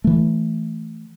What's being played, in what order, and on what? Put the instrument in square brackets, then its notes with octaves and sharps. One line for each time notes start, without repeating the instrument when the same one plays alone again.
[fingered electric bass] E3 A3